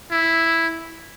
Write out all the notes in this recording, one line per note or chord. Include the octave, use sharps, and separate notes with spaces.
E4